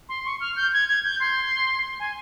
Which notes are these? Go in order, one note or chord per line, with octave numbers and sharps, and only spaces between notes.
C6
C#6
F6
G6
G#6
G#6
G6
C6
G#5